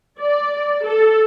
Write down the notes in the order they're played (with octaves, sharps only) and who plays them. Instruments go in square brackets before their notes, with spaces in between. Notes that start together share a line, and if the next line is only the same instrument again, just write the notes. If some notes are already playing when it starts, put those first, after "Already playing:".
[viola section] D5
A4